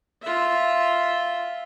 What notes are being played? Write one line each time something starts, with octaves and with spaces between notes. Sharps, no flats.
F4 E5